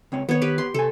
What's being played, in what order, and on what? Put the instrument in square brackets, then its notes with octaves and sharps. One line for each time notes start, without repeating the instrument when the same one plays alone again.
[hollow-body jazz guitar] C#2 C4 C#5
[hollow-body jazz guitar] D#3 [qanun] B3 C#5
[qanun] G4 B4
C6
[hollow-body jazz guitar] C3 G#5 [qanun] A4